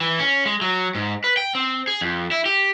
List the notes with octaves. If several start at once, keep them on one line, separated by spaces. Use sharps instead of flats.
E3
C#4
G#3
F#3
G#2
B4
G5
C4
G#4
F2
E4
G4